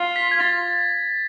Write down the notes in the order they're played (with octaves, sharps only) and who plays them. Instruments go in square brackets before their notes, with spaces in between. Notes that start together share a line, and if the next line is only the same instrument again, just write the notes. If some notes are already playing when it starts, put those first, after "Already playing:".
Already playing: [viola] F4
[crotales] B6
G#6
A6